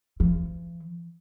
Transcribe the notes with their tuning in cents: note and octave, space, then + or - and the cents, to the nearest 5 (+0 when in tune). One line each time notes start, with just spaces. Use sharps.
F3 -45